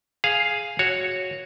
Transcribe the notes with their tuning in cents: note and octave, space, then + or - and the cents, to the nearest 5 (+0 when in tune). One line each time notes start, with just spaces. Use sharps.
G#4 +0 F5 +0
F#4 +0 C#5 +0